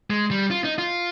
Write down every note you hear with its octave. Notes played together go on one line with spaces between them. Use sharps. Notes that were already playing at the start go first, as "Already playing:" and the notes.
G#3
G3
F4
D#4
F4